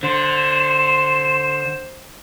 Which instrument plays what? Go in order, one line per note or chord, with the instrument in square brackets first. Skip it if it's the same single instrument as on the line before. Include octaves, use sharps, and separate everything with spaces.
[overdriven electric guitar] D3 [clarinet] C5 [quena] C6 [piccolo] E7